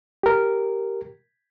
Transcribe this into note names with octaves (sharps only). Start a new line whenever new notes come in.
G4 A#4